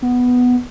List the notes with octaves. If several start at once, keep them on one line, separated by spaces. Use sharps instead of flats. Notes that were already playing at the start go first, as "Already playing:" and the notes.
B3